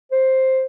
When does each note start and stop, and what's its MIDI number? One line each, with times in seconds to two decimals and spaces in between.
0.12 0.65 72